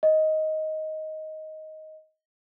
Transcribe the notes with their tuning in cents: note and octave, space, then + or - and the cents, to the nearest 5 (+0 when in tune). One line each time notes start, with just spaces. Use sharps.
D#5 +10